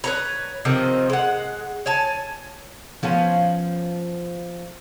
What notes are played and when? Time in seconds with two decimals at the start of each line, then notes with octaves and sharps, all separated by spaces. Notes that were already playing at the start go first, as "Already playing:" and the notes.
0.04 B4 C#5 A#5
0.65 C3 D#3 F3
1.10 G#3 F#5
1.86 C#5 G#5 A5
3.03 F3 B3 C#4